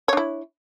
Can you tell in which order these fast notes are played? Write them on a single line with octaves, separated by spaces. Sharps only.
C#5 D4 E4